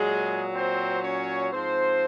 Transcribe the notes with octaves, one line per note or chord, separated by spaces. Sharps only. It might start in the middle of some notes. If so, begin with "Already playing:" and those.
Already playing: A#2 F#3 G#3 G#4
C4 C5
C#4 C#5
G#2 F3 C4 C5